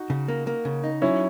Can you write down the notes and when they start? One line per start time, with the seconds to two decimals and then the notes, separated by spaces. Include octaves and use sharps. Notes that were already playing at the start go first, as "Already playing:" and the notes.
Already playing: D#4 F#4
0.10 C#3
0.28 A#3
0.47 A#3
0.65 C#3
0.84 D#4
1.02 F#3 C#4 E4